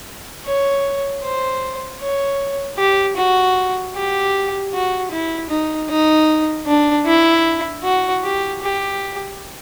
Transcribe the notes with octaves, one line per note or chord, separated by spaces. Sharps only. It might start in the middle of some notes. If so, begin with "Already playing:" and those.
C#5
C5
C#5
G4
F#4
G4
F#4
E4
D#4
D#4
D4
E4
F#4
G4
G4